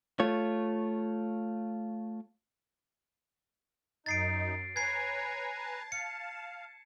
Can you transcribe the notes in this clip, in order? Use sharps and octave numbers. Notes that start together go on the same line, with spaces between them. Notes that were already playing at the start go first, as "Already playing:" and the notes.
A3 F4 C#5
F#2 D#4 A6 C7 D7
B4 C#5 G#5 A#5 G#6 C7
A5
F5 C#7